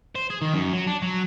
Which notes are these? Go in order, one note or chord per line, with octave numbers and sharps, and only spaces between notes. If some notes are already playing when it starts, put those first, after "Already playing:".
C5
G#4
D#3
F#2
F#3
D4
F#3